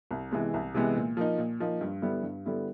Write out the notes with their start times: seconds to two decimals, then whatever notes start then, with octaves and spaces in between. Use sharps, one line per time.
0.11 C2
0.31 C3 E3 G#3 B3
0.54 C2
0.74 C3 E3 G#3 B3
0.97 A#2
1.17 F3 A#3 D#4
1.38 A#2
1.60 F3 A#3 D#4
1.81 G2
2.02 D3 G3 B3 E4
2.23 G2
2.46 D3 G3 B3 E4